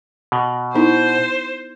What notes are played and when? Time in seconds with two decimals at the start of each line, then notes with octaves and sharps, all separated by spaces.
0.32 B2
0.75 B3 D#4 E4 C5